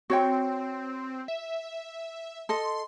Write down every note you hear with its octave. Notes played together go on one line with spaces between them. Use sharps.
C4 F#4 C#5 G5
E5
A4 D#5 C6